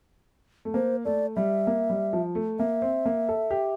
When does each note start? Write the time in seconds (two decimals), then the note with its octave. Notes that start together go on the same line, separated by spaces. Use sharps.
0.65 A3
0.74 A#3 C5
1.05 A3 D5
1.36 G3 E5
1.67 A#3
1.90 G3
2.13 F3
2.35 A3
2.59 A#3 E5
2.82 C4
3.06 A#3
3.29 A4
3.51 G4